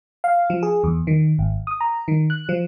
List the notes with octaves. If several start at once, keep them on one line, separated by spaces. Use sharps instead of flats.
F5
F3
G#4
E2
D#3
G#1
D#6
A#5
D#3
F#6
F3